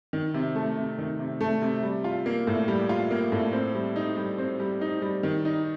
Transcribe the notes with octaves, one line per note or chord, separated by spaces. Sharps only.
D#3
C3
A3
C3
D#3
C3
A3
C3
G3
F4
A#3
A2
G3
F4
A#3
A2
C4
G3
D#4
G3
C4
G3
D#4
G3
D#3
D#4